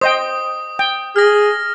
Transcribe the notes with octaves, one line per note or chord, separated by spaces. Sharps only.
C5 D#5 G5 D#6
G5
G#4 F6 A#6